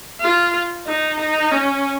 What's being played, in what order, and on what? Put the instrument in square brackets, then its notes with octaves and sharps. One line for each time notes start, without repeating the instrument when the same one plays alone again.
[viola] F4
D#4
D#4
C#4